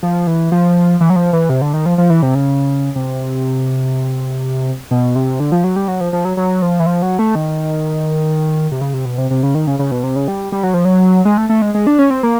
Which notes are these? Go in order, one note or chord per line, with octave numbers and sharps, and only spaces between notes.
F3
E3
F3
E3
F#3
F3
E3
C3
D3
D#3
F3
F3
E3
C3
C#3
C3
B2
C3
D3
F3
F#3
G3
F#3
F3
F3
F#3
F#3
F3
E3
F3
F#3
A3
D#3
C3
C#3
C3
B2
C3
C3
C#3
D#3
C#3
C#3
B2
C3
C#3
G3
G3
F#3
F3
F#3
G#3
A3
A3
G#3
G#3
D4
C#4
C4
A#3